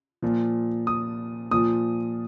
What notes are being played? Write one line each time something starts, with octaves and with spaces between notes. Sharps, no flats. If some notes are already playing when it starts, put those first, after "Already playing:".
A#2 F3
D#6
A#2 F3 D#6